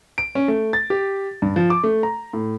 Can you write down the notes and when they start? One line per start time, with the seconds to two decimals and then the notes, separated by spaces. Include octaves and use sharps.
0.18 D7
0.35 C#4
0.48 A3
0.73 A6
0.90 G4
1.42 G2
1.56 F3
1.70 D6
1.84 A3
2.03 A#5
2.33 A2